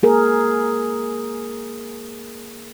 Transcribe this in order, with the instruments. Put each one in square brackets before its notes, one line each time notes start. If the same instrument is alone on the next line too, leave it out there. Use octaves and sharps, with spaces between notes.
[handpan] A#3 G#4 A#4